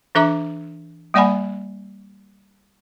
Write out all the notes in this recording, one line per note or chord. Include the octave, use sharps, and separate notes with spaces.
E3 D4 A4 E5 A#5 D6
G3 A#3 D5 F#5 G#5 B5